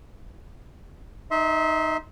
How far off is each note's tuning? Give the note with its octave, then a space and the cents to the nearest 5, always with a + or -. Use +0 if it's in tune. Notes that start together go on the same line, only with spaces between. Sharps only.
D#4 +0 E5 -30 C6 +0